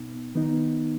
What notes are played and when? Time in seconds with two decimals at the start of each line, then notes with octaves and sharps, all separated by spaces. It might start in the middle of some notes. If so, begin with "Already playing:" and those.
Already playing: B2 B3 D#4
0.35 D#3 B3 D#4